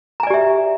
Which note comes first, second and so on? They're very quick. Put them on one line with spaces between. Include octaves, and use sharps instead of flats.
A#5 G#5 D5 G4 E5